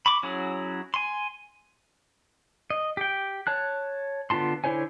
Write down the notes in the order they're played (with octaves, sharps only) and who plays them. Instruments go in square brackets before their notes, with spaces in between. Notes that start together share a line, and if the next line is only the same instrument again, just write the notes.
[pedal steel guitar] B5 C#6 D6
F#3 C#4 E4 F#4 G#4
G#5 C6
D#5
G4 G5
C#5 A5 F#6
D3 B3 F4 A5 C6
D3 E4 C5 C#5 G#5